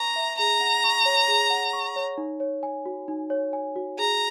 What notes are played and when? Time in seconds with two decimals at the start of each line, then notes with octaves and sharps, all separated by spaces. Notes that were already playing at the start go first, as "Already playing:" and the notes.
Already playing: B4 G#5 A#5 C#6
0.16 E5
0.38 G#4 A#5
0.61 F#5
0.84 C#6
1.05 C#5
1.28 G#4
1.50 F#5
1.73 C#6
1.96 C#5
2.18 D#4
2.40 C#5
2.63 G#5
2.86 F#4
3.08 D#4
3.30 C#5
3.53 G#5
3.76 F#4
3.98 G#4 A#5